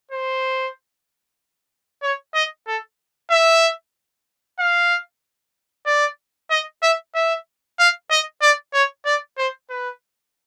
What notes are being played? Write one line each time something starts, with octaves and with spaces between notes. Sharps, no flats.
C5
C#5
D#5
A4
E5
F5
D5
D#5
E5
E5
F5
D#5
D5
C#5
D5
C5
B4